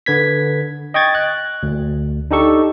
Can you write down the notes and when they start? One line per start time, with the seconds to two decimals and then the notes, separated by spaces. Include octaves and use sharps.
0.06 D3 B4 G#6 B6
0.94 D#5 G5 C#6 G#6 A6
1.15 F#6
1.63 D2
2.31 D4 D#4 G4 A4 C#6